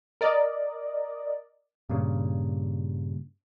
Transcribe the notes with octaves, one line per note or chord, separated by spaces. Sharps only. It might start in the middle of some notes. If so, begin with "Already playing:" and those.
A#4 D5 D#5
G2 A#2 C#3